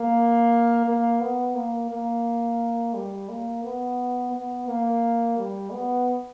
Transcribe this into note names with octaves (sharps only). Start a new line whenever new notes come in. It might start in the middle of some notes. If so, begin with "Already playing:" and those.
Already playing: A#3
A#3
B3
A#3
A#3
G3
A#3
B3
B3
A#3
G3
B3